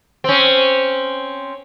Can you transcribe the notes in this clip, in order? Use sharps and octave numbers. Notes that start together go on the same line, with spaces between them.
C4 C#4